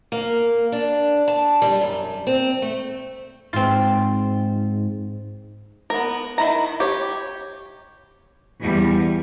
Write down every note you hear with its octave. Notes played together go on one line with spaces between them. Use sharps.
A#3
D4
A5
G3
F#2
C4
A3
G#2 C4 F4
B3 A#4
D#3 E4 A#5
G4 C#5
E2 G3